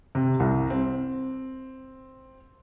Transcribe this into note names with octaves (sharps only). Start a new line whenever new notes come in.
C3
C2
C4